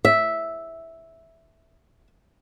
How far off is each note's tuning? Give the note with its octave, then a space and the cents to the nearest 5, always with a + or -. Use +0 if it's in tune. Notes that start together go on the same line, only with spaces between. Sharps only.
E5 -5